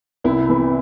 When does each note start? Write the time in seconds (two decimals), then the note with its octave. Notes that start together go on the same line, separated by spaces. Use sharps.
0.24 C2 E4
0.49 C3 E3 B3